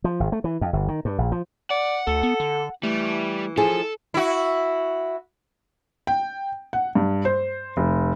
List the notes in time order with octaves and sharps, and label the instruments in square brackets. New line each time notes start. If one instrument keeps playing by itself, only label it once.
[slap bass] F3
G#1
A3
E3
F2
G1
D#3
G2
A#1
F3
[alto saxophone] D5 [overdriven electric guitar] F#5
[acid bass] D2 [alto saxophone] A4
[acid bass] B3
D3
[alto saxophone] E3 [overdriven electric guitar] G3 [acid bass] A3
[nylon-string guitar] F3 E4 G#4 [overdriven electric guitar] A4
[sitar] E4 F#4
[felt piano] G5
F#5
G2
C5
F1